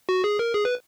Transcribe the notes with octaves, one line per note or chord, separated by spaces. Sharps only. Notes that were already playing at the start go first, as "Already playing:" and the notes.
F#4
G#4
A#4
G#4
B4